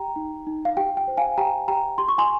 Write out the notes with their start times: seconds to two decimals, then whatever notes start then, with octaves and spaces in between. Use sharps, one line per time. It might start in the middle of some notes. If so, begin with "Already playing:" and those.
Already playing: G4 G5 A#5
0.16 D#4
0.47 D#4
0.65 F5
0.77 G4 G5
0.97 G5
1.08 C5
1.17 F5 G#5
1.37 G4 G5 A#5
1.68 G4 G5 A#5
1.98 G4 C6
2.08 C#6
2.18 G#5 C6